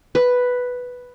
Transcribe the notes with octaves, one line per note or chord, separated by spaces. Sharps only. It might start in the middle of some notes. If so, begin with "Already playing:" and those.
B4